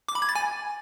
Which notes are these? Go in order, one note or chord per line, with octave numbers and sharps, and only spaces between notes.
D6
B5
G#6
A6
G#5